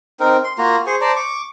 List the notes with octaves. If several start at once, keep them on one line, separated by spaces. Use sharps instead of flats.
C4 D#4 A#4
C6
A#3 F4 F#4 A#5
G#4 C5 C#6
C5 D5 A5 A#5
C#6 D6